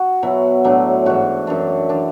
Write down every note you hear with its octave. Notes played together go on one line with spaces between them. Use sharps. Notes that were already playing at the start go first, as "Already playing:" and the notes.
Already playing: F#4
B2 F#3 E4
A2 F#3 D4
G#2 E3 F#4
F#2 E3 D4
E3 D4